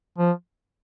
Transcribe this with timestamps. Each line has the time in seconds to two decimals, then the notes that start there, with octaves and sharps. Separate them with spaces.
0.18 F3